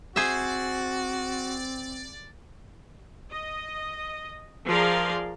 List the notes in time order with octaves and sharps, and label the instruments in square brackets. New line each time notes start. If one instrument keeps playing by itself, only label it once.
[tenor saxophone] C4 [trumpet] F#4 [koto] G#4 C5 E5 [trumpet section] D5
[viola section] D#5
F3 G#4 A#4 D5 F5 C6